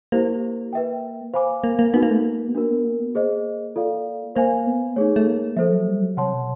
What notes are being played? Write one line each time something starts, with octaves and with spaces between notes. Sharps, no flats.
A#3 E4 G4 C5
B4 E5 G5
C5 F5 G#5 B5 D6
A#3
A#3
B3 D#4 F#4 B4
A#3
A3
A#3
B3
A#3 D4 F#4 A#4
B3
A#3
B3
A#3 G#4 C5 D#5
F4 A4 D5 F5
A#3 C5 F5 G#5
B3
A3 D#4 G#4 C#5
A3
A#3
F3 A4 C5 E5
F#3
G3
F#3
C3 C#5 F#5 A5 C6
B2